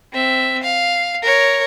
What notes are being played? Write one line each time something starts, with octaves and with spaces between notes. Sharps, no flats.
C4 E5
F5
A#4 C#5